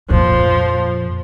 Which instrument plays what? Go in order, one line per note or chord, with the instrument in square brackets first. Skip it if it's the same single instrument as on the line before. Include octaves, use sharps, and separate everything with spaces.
[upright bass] F2 A#2 [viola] F3